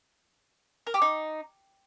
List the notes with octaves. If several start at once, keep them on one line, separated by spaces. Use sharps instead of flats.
A#4
G4
D#4